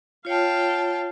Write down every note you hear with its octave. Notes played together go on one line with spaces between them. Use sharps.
F4 C#5 F5 G5 A5